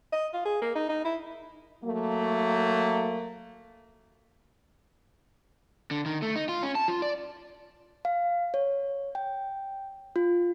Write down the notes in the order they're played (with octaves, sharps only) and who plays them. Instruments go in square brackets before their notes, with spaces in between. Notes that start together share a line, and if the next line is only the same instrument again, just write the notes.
[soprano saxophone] D#5
F4
G#4
A#3
D#4
D#4
E4
[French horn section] F#3 A3 A#3
[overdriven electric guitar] D3
D#3
A3
D#4
F4
C#4
A5
F4
D5
[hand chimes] F5
C#5
G5
F4